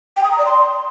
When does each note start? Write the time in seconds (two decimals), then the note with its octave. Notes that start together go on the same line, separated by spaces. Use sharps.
0.17 G5
0.24 D#6
0.31 A#5
0.38 D5
0.46 C6